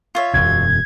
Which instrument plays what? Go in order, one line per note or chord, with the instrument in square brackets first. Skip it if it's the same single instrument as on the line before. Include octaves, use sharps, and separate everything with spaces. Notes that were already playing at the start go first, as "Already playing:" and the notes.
[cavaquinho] F4 C#5 E5
[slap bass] E1 F#2 B2 [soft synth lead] G#6